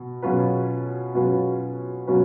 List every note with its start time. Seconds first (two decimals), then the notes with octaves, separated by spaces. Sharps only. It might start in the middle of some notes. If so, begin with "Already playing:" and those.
Already playing: B2
0.22 B2 F#3 C#4 F4 B4
1.15 B2 F#3 C#4 F4 B4
2.07 B2 F#3 C#4 F4 B4